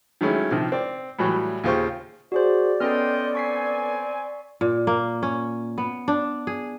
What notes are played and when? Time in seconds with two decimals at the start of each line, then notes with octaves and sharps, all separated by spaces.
0.21 D#3 F#3 G#3 A3 C#4 E4
0.51 C3 D#3 F3
0.72 C4 D5
1.19 A2 E3 F#3 G3 F#4
1.64 D#2 C#3 F4 G4 C5 C#6
2.32 F#4 G#4 C5 D5
2.80 B3 C#4 A4 D#5 G5 C6 F6
3.35 C4 G#5 C#6 B6 C7
4.61 A#2
4.87 A#3
5.23 C#4
5.78 B3
6.08 D4
6.47 G#4